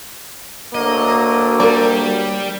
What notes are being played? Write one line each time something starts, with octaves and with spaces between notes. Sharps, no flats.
D2 F#3 A#3 D#5
G3 A#4 D5